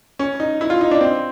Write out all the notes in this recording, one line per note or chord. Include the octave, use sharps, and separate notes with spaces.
C#4
D#4
E4
F4
D#4
D4
C4